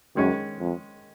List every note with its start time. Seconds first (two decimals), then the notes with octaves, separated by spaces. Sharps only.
0.16 F#2 D#3 G#3 C#4
0.59 F2